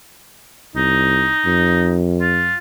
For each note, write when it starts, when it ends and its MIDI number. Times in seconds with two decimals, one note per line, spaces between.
0.76 1.33 36
0.76 2.02 63
1.46 2.56 41
2.21 2.57 65